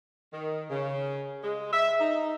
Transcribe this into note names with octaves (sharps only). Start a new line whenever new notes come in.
D#3
C#3
G#3
E5
D#4